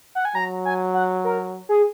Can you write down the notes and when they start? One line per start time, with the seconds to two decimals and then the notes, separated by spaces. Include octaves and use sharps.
0.15 F#5
0.25 G#5
0.35 F#3 A#5
0.65 G#5
0.94 F#5
1.24 A#4
1.69 G#4